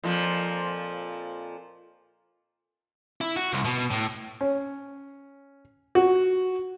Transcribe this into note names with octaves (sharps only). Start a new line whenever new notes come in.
F2 A#2 F3
E4
F#4
C2
B2
A2
C#4
F#4